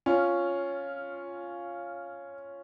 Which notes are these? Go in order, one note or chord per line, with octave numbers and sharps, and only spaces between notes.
C#4 F4